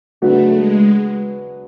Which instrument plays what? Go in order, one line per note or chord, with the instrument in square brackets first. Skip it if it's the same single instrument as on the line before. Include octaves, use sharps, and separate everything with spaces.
[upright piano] C#3 F#3 B3 D4 F#4 [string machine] A3
[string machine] G#3